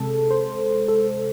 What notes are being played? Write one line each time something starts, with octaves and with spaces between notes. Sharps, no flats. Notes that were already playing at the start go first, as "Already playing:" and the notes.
Already playing: C3 G#3 A4
C5
A4